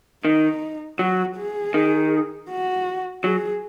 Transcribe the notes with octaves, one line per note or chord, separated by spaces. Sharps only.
D#3 D#4
F#3 F#4
G#4
D#3
F#4
F#3 G#4